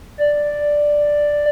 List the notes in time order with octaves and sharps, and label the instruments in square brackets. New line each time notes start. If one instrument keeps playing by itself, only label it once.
[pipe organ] D5